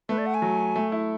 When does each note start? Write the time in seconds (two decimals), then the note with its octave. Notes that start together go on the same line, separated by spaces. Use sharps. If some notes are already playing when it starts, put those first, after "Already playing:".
0.09 A3 B4
0.18 D5
0.26 F#5
0.34 G#5
0.42 F#3
0.76 A3
0.92 E4